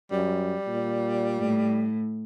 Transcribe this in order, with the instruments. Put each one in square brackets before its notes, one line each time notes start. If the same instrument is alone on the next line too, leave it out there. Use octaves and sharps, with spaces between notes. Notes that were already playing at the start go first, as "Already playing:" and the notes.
[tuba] F#2 [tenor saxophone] G3
[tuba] A#2
[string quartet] A2